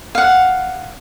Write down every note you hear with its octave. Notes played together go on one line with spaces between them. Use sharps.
F5 F#5